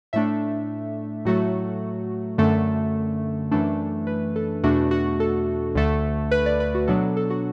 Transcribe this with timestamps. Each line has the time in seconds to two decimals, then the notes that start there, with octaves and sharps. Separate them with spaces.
0.13 A2 A3 D4 E5
1.25 A2 F#3 A3 F#4
2.38 F#2 D3 A3
3.51 F#2 E3 A3 D4
4.07 B4
4.36 A4
4.64 E2 B2 A3 D4 F#4
4.91 F#4
5.20 A4
5.75 D2 D3 A3
6.31 B4
6.46 D5
6.60 B4
6.75 F#4
6.88 B2 F#3 B3 D4 A4
7.17 A4
7.30 F#4